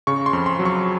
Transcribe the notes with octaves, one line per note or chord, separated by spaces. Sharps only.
C#3 C#6
C6
F2
C6
F#3
C#6